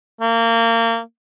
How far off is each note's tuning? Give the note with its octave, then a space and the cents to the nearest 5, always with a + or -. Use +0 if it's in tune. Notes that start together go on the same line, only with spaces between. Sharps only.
A#3 -25